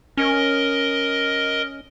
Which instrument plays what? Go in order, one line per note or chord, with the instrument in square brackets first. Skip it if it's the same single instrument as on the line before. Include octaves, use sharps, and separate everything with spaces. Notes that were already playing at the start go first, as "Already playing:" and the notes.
[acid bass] C#4 [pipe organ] A#4 D#5